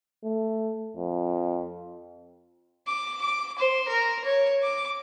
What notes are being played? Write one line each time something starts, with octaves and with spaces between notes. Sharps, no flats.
A3
F2
D6
D6
C5
A#4
C#5
D6